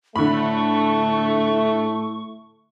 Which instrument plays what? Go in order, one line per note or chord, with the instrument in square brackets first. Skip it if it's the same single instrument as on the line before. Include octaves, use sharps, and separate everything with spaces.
[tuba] A2 [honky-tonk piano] D3 B5 [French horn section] A3 [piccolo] C#6